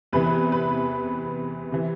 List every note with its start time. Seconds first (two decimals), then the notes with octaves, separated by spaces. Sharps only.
0.13 E2 C3 E3 B4
0.52 B4
1.72 C3 E3